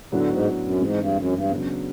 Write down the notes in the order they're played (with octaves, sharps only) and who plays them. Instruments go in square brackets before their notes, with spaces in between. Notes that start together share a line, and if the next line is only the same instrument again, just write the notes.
[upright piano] A2 F#3 B3 D4 F#4 [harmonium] D3
[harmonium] G#2
F#2
[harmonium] G#2 [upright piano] E3 G#3 C4
[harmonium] G2
F#2
G2
[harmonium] F#2 [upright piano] C#3 F#3 B3 D4
[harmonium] F#2